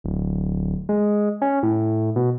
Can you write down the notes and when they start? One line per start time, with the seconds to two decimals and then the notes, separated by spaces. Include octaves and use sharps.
0.04 D1
0.89 G#3
1.42 C#4
1.63 A2
2.16 B2